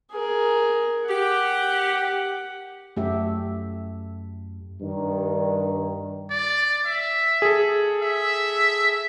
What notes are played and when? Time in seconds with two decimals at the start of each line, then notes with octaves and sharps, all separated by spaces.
0.11 G#4 A#4
1.09 G4 F#5
2.97 F#2 A3 G4 E5
4.81 G2 D#3
6.31 D5
6.86 E5
7.42 G#4 A4
8.02 E5